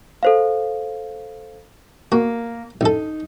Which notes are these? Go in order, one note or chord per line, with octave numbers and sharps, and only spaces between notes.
A4 C5 F5
A#3 F#4
A1 D#4 A4